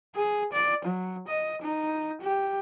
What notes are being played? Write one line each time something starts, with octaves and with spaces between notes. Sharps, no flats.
G#4
D5
F#3
D#5
D#4
G4